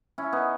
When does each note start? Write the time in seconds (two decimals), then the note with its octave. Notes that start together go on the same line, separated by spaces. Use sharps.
0.18 C#4 E4
0.33 B3 D#4